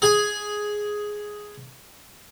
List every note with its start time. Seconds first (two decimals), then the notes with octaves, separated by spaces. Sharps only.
0.02 G#4 G#5